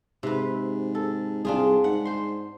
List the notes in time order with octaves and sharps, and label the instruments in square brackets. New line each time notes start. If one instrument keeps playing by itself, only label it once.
[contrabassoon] G#2 [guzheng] C3 B4
[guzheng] A4
[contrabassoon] C2 [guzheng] D4 F4 G#4
[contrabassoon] G#2 [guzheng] F#5
[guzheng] C5 C6